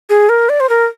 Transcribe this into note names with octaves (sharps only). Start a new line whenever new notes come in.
G#4
A#4
D5
C5
A#4